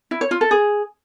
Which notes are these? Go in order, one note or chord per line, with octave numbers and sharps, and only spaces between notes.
E4
C#5
F4
A4
G#4